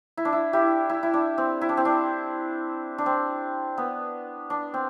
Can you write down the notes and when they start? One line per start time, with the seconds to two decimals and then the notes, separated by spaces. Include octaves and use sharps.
0.17 E4
0.25 D4
0.33 E4
0.53 E4 G4
0.89 E4
1.03 E4
1.14 D4
1.38 C4
1.61 E4
1.69 D4
1.77 C4
1.85 D4
2.98 D4
3.06 C4
3.78 B3
4.50 D4
4.74 C4